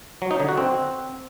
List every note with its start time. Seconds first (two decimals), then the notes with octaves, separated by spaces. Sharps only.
0.22 F#3
0.31 D#4
0.40 D3
0.49 F#4
0.57 C4